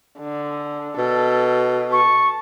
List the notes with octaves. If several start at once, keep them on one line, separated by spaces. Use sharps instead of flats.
D3
B2 A4
A5 C#6